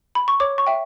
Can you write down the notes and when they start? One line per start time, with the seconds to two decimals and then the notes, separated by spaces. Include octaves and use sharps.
0.15 B5
0.28 C#6
0.40 C#5 D6
0.58 C#6
0.67 E5 G5